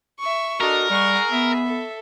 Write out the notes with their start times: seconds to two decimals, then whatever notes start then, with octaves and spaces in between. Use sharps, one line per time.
0.19 E5 C#6
0.61 D4 F#4 A4 A#4 D#5
0.90 G3 G#4 F#5 C#6
1.31 B3 E5
1.66 A4